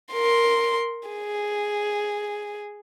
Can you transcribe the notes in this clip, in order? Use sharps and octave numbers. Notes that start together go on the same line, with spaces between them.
A#4 C6
G#4